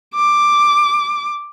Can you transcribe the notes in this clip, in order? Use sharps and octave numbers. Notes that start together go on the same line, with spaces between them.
D6